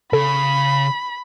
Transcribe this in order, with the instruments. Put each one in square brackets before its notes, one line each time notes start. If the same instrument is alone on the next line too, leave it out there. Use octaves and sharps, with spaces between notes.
[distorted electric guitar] C#3 [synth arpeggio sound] A4 [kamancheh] B5